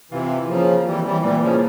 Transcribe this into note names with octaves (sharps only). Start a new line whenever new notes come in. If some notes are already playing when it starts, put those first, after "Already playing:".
C3 E3 F4
C#3 F3 A#3
E3 G3 C4
E3 G3
A#2 E3 G3
C#3 F3